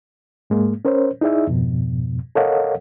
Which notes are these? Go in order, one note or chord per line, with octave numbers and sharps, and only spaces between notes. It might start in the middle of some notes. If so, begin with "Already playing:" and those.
G#2 G#3 A#3
C#4 A#4 C5 C#5
D#4 E4 G#4 D5 E5
F2 G#2 B2 F3
A4 A#4 C#5 D#5 F5 F#5